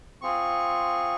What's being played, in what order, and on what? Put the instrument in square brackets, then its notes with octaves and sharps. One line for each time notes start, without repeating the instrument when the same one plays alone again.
[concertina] C4 F4 G#4 C#6